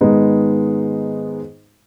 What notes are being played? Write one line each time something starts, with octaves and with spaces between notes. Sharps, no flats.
G#2 D#3 G#3 B3 D#4